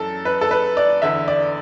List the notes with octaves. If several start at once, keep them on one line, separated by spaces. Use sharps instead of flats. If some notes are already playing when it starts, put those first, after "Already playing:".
Already playing: F#2 E3 A4
B4
A4
B4
D5
E2 D3 E5
D5